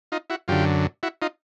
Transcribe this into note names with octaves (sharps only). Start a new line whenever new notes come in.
D#4 F4
E4 F#4
F#2 D3 F4 G4
E4 F#4
D#4 F4